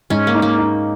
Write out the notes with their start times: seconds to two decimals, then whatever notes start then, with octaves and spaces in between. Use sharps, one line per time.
0.10 G#2 C#4
0.27 A#3
0.35 D#4
0.42 A#3
0.58 D#4